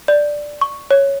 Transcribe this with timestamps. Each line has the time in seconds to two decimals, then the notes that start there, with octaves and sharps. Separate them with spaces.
0.08 D5
0.61 C#6
0.91 C#5